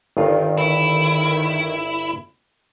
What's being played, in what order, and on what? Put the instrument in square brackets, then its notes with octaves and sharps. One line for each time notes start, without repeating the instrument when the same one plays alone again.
[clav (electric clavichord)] G1 G2 F4 [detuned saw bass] D#3
[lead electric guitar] E4